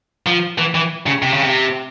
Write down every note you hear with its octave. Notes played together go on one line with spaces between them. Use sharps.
F3
E3
E3
C#3
C3
C#3
C3